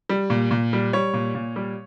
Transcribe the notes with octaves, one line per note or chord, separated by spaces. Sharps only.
G3
A#2
A#2
G3
G3 C#5
A#2
A#2
G3